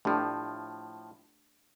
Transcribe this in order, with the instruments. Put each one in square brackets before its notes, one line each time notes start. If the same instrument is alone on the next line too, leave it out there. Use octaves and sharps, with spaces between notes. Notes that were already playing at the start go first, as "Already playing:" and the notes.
[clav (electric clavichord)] A2 F3 [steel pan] A3 D4 G4